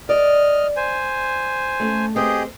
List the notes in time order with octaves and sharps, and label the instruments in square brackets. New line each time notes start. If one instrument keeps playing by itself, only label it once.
[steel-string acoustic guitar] D5 [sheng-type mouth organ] D#5 F6
[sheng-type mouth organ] C5 G#5
[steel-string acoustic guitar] A3 C#4
[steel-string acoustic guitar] C4 C5 [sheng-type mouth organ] G4 G#4 D#5